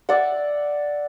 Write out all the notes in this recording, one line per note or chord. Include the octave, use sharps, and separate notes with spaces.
D5 E5 F#5